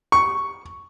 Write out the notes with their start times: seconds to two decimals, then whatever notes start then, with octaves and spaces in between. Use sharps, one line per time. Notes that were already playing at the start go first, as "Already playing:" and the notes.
0.12 C#6